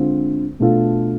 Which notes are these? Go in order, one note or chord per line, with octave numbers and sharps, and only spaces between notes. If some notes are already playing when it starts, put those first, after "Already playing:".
Already playing: D3 G#3 C4 F4
B2 A3 D4 F4 A4